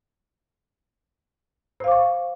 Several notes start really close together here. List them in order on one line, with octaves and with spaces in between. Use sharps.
C5 F5 D6 C#6